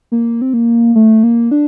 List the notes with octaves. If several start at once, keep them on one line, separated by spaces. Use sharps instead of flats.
A#3
C4
A#3
A3
A#3
D4